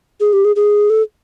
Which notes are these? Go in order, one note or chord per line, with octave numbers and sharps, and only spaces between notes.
G#4
G4
G#4
G#4
A4